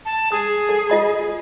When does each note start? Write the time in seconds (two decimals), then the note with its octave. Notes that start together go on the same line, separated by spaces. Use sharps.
0.05 A5
0.32 G#4 D#6
0.69 A4
0.90 F4 D#5 B5